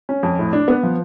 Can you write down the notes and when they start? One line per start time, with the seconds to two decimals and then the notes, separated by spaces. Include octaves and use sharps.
0.09 C#4
0.23 F2
0.39 A2
0.53 D4
0.68 B3
0.83 F3